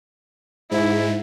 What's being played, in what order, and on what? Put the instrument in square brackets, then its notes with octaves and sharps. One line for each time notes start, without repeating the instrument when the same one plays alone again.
[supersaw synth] G#2 [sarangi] E4